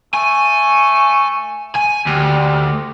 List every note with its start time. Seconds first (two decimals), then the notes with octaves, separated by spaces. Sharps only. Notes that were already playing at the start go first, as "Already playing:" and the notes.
0.14 A3 G#5
1.75 G#5
2.06 D2 G4